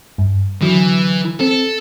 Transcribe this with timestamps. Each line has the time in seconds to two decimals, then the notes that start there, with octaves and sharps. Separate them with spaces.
0.18 G2
0.61 D3 E3 F#3
1.41 C4 A4